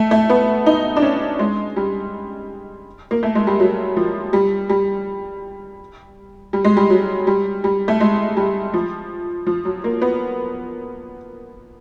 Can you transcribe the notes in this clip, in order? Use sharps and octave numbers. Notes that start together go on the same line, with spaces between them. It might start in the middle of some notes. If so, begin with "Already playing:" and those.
Already playing: A3
A3
B3
D#4
D4
C#4
G#3
G3
A#3
A3
G#3
G3
F#3
F3
G3
G3
G3
G#3
G3
F#3
G3
G3
A3
G#3
G3
F3
F3
F#3
A#3
B3